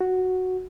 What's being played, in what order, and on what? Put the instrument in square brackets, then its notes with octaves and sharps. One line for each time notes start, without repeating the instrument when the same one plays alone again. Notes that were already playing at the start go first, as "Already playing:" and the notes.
[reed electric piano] F#4